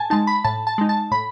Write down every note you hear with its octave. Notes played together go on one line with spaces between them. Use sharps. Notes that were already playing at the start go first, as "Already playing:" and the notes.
Already playing: A2 G#5 A5
G#3 D#4 A5
B5
A2 A5
A5
G#3 D#4
A5
A2 B5